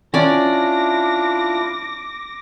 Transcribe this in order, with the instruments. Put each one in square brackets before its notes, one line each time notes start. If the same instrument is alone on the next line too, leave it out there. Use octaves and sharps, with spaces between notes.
[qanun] C#4 D5 [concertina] D4 E4 F4 [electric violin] D6 A#6